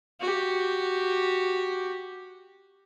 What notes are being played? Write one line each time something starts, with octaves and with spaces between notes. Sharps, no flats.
F#4 G4